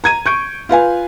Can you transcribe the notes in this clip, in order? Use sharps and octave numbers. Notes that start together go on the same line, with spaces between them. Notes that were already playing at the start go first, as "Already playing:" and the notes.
A#5 G#6 D#7
C#6 G6 D7
F4 B4 F5 G#5